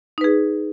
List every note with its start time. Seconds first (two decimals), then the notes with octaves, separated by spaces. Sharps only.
0.18 D#4
0.21 B4
0.24 G#4